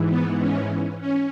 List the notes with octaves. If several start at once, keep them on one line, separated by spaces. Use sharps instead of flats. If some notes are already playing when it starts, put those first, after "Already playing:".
Already playing: G#2 E3
B3
C#4
C#4